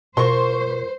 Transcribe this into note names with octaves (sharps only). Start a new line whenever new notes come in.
B2 F4 A#4 C5 C6 C#6